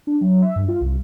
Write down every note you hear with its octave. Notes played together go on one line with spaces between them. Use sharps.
D4
F#3
E5
G2
F4
C2